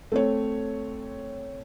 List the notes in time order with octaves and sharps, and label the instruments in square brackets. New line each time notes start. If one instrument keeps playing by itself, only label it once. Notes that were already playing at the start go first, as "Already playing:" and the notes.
[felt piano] A3 C4 C#5